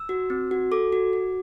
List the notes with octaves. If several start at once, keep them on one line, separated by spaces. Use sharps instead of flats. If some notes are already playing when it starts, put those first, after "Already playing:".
Already playing: E6
F#4
C4
F#4
A4 D6
F#4
F#4